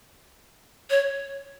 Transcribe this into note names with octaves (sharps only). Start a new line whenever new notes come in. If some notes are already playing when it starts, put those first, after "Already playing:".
C#5